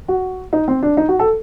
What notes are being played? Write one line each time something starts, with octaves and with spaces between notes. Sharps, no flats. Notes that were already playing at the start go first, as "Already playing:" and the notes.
F#4
D#4
C4
D4
D#4
F#4
A4